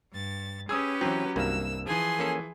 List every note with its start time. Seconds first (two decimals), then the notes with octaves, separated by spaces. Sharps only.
0.13 G2 A6
0.69 C#4 G4 G#4 B4 D#6 E6 G#6
1.01 E3 F#3 C4
1.36 C2 G2 A#3 E6
1.86 E3 F3 G#4 G#5 C6
2.19 A#3 C#4 A4